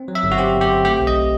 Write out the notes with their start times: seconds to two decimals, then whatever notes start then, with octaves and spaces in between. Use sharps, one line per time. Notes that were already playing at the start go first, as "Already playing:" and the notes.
Already playing: C4
0.08 F#3
0.15 E5
0.23 G1
0.32 F#4
0.38 C4 G4
0.54 G1
0.61 G4
0.69 C4
0.85 A3 G4
1.00 B1
1.07 D#5